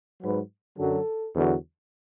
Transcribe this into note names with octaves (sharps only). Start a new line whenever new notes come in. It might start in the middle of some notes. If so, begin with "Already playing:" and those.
G#2 F#3 B4
F#2 D3 F#3 A4
E2 D3 F#3